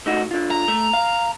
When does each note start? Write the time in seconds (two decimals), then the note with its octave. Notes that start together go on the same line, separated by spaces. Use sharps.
0.06 A3 D#4 F#4
0.31 D3 F4
0.51 A#5
0.68 A3
0.93 F5